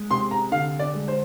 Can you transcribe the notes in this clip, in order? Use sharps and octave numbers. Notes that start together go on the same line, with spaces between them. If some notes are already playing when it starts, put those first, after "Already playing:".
Already playing: G#3
C3 C6
A#5
D3 F5
D5
G#3
C5